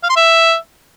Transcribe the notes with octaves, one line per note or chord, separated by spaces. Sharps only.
F5
C6
E5